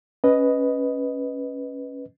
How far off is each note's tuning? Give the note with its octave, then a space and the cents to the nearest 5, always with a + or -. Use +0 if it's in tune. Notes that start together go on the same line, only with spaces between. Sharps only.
C#4 +0 B4 +0 D#5 +0